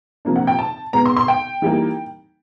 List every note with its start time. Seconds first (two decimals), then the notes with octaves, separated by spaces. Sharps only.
0.25 C3 F3 A#3 D4
0.36 F#5
0.47 G5
0.59 A5
0.93 B2 G#3 B3 A#5
1.06 C6
1.17 C6
1.28 G5
1.62 E3 G3 A#3 D#4